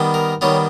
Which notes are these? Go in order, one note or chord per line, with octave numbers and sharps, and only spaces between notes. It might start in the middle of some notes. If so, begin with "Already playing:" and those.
Already playing: D#3 G3 B3
A#4
D#3 G3 B3 C#5